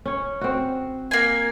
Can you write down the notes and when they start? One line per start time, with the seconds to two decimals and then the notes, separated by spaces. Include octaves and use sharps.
0.05 C#4 C#5
0.41 C4 F#4
1.11 A#3 G#5